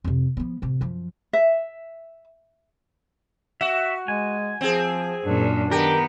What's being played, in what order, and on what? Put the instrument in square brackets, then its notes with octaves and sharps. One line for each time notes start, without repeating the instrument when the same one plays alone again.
[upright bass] F2 C3
F3 B3
A1 C3
F#2 F3
[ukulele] E5
[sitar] F#4 [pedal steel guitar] E5
[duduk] G#3 [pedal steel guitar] G#5
[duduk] F3 [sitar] C4 G#4
[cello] F#2 A#2 [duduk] D4
[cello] D#3 B3 [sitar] G4 [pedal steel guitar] A#4